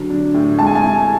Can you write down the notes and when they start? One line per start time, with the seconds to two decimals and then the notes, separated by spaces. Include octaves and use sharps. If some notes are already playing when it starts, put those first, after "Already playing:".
Already playing: D3 F#3
0.10 D4
0.34 A2
0.59 G#3 A5
0.67 G#5
0.75 A5
0.84 E4